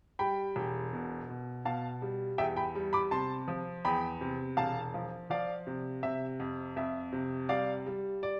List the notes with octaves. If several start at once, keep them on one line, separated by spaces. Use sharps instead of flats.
G3 G5 B5
E1
B2
B2
B2 F5 A5
G3
E2 E5 G5
G5 B5
G3
B5 D6
C3 A5 C6
F3
E2 G5 B5
C3
E1 F5 A5
F3
F3 D5 F5
C3
C3 E5
F2
F2 E5
C3
G3 D5 F5
G3
D5